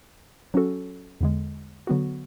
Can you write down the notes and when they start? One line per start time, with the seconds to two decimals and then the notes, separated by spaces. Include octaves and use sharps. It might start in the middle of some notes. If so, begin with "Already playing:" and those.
0.54 F#3 C#4 F#4 A4
1.21 E2 D3 G#3
1.87 D3 F#3 B3 F#4